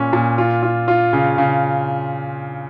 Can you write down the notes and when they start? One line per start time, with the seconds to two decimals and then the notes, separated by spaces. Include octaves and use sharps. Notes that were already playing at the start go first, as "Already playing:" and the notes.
Already playing: A#2 C#4
0.13 A#2
0.38 F4
0.63 F4
0.88 F4
1.13 C#3
1.38 C#3